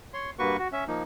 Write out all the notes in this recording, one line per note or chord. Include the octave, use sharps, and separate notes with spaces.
C#5 C6
G2 A#3 F#4 B4 C#6
F#4
C#4 E5
F3 A#3 D#4